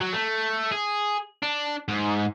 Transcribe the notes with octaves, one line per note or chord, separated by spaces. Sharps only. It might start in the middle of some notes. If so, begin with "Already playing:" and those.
F#3
A3
G#4
D4
G#2